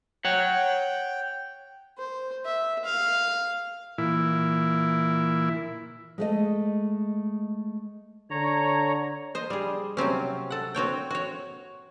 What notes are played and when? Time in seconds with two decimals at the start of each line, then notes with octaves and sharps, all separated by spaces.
0.25 C#5 F#5 G5
1.98 C5
2.45 E5
2.85 F5
3.98 A#2 E3 E4
6.18 G#3 A3 D#5
8.31 D3 C#5 A#5
9.35 C5 D#5
9.50 G3 G#4
9.97 C3 F#3 C4 C#4
10.51 A4 F#5
10.75 C4 F#4 C#5 G5
11.11 F#4 C#5